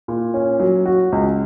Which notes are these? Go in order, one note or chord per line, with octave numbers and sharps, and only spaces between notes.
A#2
C#4
F#3
F#4
C#2